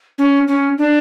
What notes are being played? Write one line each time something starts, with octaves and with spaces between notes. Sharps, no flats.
C#4
C#4
D4